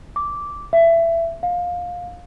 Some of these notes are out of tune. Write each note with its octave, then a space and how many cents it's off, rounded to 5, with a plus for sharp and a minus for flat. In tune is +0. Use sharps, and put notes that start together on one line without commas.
D6 -10
E5 +20
F5 +20